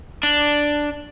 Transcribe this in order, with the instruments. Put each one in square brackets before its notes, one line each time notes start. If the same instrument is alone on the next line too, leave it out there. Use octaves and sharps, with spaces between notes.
[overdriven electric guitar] D4